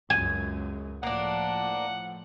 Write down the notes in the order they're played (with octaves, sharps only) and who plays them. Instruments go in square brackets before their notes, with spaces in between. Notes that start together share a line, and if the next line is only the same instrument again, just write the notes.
[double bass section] C#2 F#2 G#3 [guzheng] G#5
[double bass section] A2 F3 [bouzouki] A#3 D4 [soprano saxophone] F#5